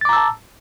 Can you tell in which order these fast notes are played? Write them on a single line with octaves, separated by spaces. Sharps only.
A6 D6 A#5 E6 A5